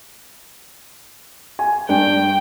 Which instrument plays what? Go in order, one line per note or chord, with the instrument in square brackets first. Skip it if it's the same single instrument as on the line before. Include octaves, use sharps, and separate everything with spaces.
[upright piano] G#5
[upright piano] G2 D4 [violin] G5